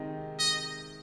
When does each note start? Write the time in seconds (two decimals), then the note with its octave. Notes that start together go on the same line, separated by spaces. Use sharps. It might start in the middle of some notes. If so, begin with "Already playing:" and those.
Already playing: C3 D#3 G#3 D#4
0.39 D#5